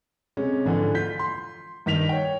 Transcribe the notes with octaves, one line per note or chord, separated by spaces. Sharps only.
C3 G#3 C#4
G#2 D3 E3 F3
F4 G6 B6
C6
G2 D#3 B6 F7
C#5 G5